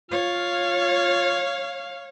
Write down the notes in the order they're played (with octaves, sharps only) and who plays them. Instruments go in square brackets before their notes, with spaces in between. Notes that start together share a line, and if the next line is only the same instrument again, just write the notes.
[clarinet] F4 [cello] C#5 [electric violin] F5